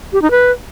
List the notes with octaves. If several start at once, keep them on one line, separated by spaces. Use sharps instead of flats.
G4
D#4
B4